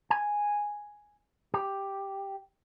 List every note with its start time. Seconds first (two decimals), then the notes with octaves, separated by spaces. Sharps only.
0.10 G#5
1.54 G4